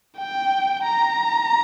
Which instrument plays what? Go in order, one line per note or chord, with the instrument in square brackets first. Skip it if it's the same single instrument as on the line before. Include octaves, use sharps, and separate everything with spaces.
[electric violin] G5
A#5